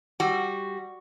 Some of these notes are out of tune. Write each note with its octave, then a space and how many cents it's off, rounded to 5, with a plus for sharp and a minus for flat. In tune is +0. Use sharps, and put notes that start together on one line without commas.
G3 +0 F#4 +0